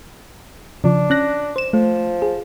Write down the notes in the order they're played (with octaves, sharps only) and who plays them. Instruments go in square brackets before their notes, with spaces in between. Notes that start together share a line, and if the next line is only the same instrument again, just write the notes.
[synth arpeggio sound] C#3 F3 [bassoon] D4
[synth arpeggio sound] C#4 F#6 A#6
C5 E7
[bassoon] F3 [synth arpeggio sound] A3
[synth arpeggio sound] G#4